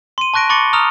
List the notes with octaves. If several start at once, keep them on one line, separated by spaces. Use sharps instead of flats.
C6 D#7
A5 C#6 F#6 A#6 D7
B5 C#6 D6 A6 C#7 G7
A#5 D#6 F6 F7